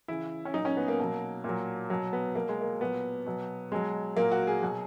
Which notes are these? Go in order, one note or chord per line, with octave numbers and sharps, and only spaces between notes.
C#3 E3 E4
C#4
A#2 F#3 D#4
C#4
B3
A#3
B2 F#3
A#2 F#3
B2 F#3
B3
B2 F#3 A#3
G#3
A#3
A#2 F#3 B3
B2 F#3
B2 F#3 G#3
A#2 F#3 A#3
F#4
G#4
B2 F#3